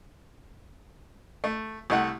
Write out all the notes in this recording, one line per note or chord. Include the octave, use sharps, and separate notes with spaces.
A3
C2 A3 F#5